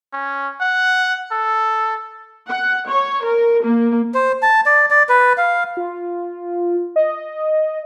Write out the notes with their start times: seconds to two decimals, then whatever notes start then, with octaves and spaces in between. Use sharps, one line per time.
0.13 C#4
0.61 F#5
1.32 A4
2.48 F#5
2.88 C#5
3.23 A#4
3.64 A#3
4.14 C5
4.42 A5
4.66 D5
4.90 D5
5.09 B4
5.37 F5
5.77 F4
6.96 D#5